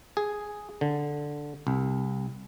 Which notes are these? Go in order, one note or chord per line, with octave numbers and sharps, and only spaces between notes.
G#4
D3
C2